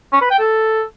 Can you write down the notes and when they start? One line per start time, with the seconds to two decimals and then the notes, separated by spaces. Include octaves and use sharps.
0.13 C#4
0.22 B4
0.30 G5
0.39 A4